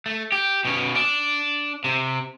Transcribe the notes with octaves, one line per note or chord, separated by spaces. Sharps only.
A3
G4
B2 C#4
D4
C3